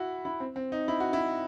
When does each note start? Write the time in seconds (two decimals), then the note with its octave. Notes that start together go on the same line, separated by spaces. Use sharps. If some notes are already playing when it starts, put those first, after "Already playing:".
Already playing: E4 F#4
0.25 E4
0.40 C4
0.56 C4
0.72 D#4
0.88 E4
1.00 F#4
1.13 E4